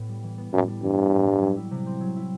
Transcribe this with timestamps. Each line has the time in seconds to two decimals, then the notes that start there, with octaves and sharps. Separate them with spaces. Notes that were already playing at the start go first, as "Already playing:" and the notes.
Already playing: A2 B3
0.09 G3
0.23 E3
0.38 B3
0.53 F#2 A2
0.68 G3
0.83 G2 E3
0.97 B3
1.12 A2
1.27 G3
1.42 F#3
1.57 E4
1.71 C3
1.86 C4
2.01 F#3
2.16 E4